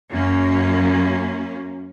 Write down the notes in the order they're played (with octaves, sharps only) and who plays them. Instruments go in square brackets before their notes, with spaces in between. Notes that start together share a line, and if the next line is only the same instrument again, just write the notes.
[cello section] F#2 A#3 C#4